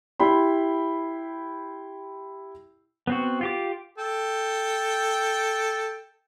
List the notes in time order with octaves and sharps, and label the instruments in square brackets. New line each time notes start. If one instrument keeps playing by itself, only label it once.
[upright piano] E4 G4 G5 B5 C6
[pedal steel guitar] B3 C4 F#4
F4 G4 D6
[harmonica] A4 G5